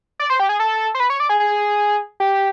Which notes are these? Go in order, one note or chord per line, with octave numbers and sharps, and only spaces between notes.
D5
C5
G4
G#4
A4
C5
B4
C#5
D5
G#4
G#4
G4